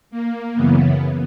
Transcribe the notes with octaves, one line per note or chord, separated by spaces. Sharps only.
A#3
F#2 C#3 E3 B3